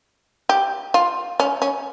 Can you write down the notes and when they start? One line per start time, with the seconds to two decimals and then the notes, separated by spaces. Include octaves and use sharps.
0.49 G4
0.94 F4
1.40 C#4
1.62 C#4